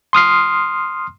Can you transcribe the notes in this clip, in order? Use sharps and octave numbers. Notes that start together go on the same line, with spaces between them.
C6 D#6 F6 C7